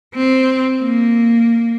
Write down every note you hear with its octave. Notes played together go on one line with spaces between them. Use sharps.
C4
A#3